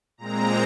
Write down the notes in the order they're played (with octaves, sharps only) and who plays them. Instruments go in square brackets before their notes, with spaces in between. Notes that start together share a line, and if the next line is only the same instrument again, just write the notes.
[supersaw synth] A#2 G#3 C4 A#5